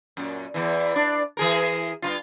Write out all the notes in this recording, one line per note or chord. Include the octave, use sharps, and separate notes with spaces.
F#2 A#2
E2 E3
D4 D5
E3 G#4 A#4
G2 D#3 F4